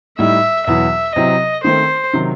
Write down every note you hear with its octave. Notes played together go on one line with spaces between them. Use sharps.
A2 G3 D#4 E5
E2 B2 F#3 B3 E4 E5
C3 F#3 C4 E4 D#5
D#3 A3 C4 C5
C3 D#3 F#3